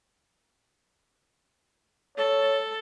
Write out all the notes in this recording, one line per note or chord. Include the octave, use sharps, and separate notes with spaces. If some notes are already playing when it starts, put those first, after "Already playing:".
A4 C#5